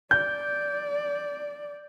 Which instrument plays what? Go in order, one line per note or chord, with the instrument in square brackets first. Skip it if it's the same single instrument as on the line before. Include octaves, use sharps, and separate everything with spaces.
[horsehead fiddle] D5 [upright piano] G6